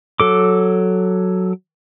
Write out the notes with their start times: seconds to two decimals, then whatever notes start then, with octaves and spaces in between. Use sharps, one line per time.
0.20 F#3 A4 D6